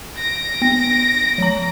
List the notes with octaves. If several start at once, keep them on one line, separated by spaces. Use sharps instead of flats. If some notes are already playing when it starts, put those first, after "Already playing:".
A#6 D7
B3
F3 A#5